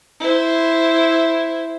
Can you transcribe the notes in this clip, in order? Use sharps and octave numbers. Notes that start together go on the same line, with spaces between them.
E4 C5